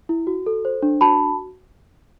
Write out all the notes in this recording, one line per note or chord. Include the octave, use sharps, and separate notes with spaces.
E4
F#4
A4
C5
D4
F#4 A5 B5